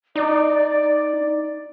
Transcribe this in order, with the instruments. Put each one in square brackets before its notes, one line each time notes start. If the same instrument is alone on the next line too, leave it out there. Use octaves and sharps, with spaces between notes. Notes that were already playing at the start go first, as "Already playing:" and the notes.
[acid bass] D#4 [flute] D5